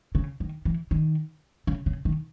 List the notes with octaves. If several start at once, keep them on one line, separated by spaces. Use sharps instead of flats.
C#3
D#3
E3
D#3
C#3
C#3
D#3